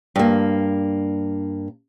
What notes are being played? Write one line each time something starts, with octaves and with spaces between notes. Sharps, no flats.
G2 A#3